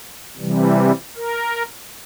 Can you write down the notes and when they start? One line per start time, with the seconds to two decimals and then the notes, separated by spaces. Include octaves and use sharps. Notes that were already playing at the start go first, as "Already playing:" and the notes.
0.37 C3 E3 G3
1.16 A#4